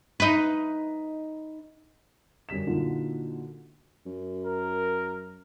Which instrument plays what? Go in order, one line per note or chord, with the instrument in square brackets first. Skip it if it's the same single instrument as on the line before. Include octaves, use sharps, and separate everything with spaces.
[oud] D#4 B4
[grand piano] F#2 D3 G3 B6 E7
A#2 D3 D#4 F4 F#4
[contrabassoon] F#2
[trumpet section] A#4